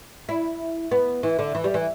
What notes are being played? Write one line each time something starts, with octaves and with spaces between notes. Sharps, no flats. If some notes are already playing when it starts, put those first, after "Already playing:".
E4
B3
E3
D3
E3
G3
E3